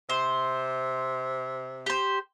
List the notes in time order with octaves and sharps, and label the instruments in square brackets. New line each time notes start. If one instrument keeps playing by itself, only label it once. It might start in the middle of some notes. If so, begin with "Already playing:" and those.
[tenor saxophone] C3 [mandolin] C5
[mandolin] G4 C5